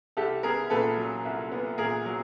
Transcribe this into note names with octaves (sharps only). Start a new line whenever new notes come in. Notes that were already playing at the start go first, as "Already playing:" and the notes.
C2 G4 A4
B3 G#4 A#4
A#2 A4 B4
F#3
C2
B3
A#2 G#4 A#4
F#3